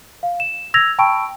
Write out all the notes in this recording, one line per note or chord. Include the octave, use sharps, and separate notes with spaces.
F5
E7
E6 G#6 A#6 F7
G5 A5 B5 C#6 E6 D7